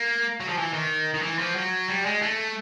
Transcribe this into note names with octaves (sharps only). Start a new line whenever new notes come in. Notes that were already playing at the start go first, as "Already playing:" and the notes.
Already playing: A#3
F#3
F3
E3
D#3
D#3
E3
F3
F#3
G3
G#3
A3